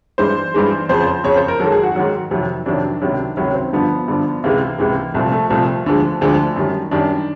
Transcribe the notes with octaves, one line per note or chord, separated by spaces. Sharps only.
G2 E3 G#3 C5
G2 E3 G#3
F2 C#3 F3 C5
C5
F2 C#3 F3 C#5
C5
A#4
G#2 D#3 F#3 A4
G#4
F#4
G#2 D#3 F#3 F#4
F2 C3 D#3 F#3
F2 C3 D#3 F#3 D4
C#2 C3 D#3 F#3
C#2 C3 D#3 F#3 C#4
C4
G2 D3 F3 B3
G2 D3 F3
C#2 C3 E3 G#3 A#3
C#2 C3 E3 G#3
C2 A#2 F3 A3
A3
C2 A#2 F3 A3
D2 D3 F3 G#3
D2 D3 F3 G#3
F#2 D#3 G3
F#2 D#3 G3 D4